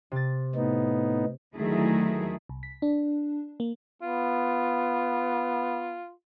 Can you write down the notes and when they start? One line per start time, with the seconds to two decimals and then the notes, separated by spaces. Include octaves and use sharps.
0.12 C3 A6
0.55 A2 B3 D#4
1.56 D2 D#3 F#3 A3 E4 G#4
2.49 C2
2.63 B6
2.82 D4
3.60 A#3
4.02 B3 F4